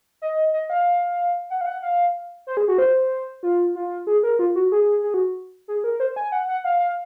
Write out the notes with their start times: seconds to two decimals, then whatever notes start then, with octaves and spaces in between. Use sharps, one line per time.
0.22 D#5
0.54 D#5
0.70 F5
1.50 F#5
1.61 F5
1.66 F#5
1.83 F5
2.47 C5
2.57 G#4
2.68 F#4
2.78 C5
3.43 F4
3.75 F4
4.07 G#4
4.23 A#4
4.39 F4
4.56 F#4
4.72 G#4
5.04 G#4
5.14 F#4
5.68 G#4
5.84 A#4
6.00 C5
6.16 G#5
6.32 F#5
6.48 F#5
6.64 F5
6.80 F5